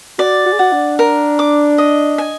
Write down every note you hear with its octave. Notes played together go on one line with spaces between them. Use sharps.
F#4 D5
F#4
G#4
F#4 F#5
D4
A#4
D6
D#5
G#5